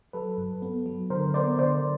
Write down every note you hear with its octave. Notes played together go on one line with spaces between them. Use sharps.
F#3 A4 B4
G2
B3
F#3
D3 A#4 C5
B3 C5 D5
D3 C5 D5